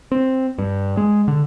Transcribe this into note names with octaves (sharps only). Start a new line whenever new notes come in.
C4
G2
G#3
D3